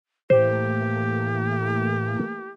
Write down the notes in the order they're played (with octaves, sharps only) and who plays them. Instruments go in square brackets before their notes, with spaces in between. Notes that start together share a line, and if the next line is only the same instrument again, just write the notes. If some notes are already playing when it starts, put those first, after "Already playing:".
[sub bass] A2 [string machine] E3 A3 A#3 [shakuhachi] G4 [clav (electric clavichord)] C5